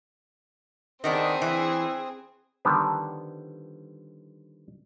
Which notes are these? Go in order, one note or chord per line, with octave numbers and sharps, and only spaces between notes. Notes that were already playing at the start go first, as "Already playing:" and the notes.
D#3 B3 C4 D4 G#4
E3
D3 D#3 F3 G3 B3